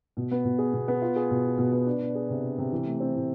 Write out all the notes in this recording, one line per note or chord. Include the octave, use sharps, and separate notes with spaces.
B2
B3
B2
G#4
B2
B3
F4
G#4
B2
F4
B2
B3
D4
D4
G#4
C3
D4
C3
E3
A3
C4
A2